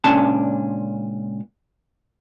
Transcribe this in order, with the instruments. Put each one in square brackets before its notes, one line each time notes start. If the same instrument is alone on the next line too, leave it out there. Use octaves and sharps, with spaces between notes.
[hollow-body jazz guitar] C#2 A#2 C#4 D4 A5